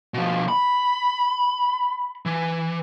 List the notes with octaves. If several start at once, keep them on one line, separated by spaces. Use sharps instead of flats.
B2 F3
B5
E3